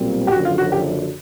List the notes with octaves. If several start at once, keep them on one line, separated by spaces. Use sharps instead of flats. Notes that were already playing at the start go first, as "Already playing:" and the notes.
Already playing: B1 A#2 G3 C4
G4
F#1 F#2 D3 F3 F#4
F4
F#4
G4